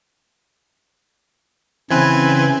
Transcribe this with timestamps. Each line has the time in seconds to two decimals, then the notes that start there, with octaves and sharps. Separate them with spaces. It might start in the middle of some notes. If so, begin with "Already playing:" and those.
1.90 C#3 E3 C4 B4 G#5